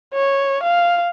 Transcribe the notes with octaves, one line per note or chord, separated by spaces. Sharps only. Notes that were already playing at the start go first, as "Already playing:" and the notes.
C#5
F5